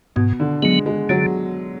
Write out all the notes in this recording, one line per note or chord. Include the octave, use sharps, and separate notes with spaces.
G#2 B2
D3
F#3 G#3 B3
G#3
D3 F#3